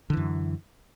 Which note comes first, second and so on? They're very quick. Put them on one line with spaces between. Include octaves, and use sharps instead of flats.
D3 E3 F#2